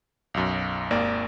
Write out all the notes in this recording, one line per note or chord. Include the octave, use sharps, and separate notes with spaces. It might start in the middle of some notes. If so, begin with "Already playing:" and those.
B1 F#2
G#1 D#2 A#3 D5